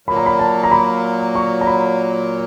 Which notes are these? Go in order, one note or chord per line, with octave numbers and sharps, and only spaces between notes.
A#2 F#3 A#3 B5
A#5
B5
A5
A#5
B5
C#6
A#5
B5